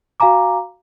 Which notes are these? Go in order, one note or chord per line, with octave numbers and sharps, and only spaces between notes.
F#4 F5 G#5 A#5 D6